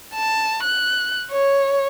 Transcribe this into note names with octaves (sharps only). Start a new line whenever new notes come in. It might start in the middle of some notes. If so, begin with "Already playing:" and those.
A5
F#6
C#5